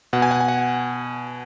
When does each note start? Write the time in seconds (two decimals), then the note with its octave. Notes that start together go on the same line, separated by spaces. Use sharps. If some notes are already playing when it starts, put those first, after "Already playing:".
0.13 B2 F#5
0.22 G#5
0.31 F#5
0.41 G#5
0.48 F#5